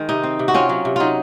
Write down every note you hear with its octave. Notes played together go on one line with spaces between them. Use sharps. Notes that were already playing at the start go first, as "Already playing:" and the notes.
Already playing: D#3 G#3
C3 D#4
C4
C3
F#4
C4 C#4 F4
F#3
C3
F#3 D#4 F4